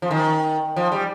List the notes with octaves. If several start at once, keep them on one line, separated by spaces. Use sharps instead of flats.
F3
D#3
F3
G3